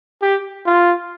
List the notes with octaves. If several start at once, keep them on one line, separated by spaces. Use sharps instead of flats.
G4
F4